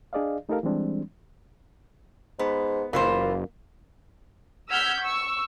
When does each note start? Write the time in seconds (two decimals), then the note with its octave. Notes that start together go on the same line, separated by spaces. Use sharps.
0.13 D4 G#4 D5 D#5 F5
0.49 A3 D#4 G4 A4 A#4 F5
0.63 E3 G3 G#3 C4 D4
2.39 G#2 B3
2.93 F#1 E3 A#3 F4 C5
4.71 F#5 E6 F6 G6 G#6 B6
5.02 C#6 E6